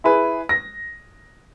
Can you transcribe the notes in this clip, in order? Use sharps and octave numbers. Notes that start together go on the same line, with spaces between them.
E4 G#4 B4
A#6